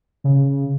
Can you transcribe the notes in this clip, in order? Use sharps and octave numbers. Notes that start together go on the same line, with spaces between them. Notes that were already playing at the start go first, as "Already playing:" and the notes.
C#3